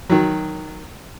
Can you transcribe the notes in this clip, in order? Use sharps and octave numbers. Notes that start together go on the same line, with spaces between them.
D#3 F#3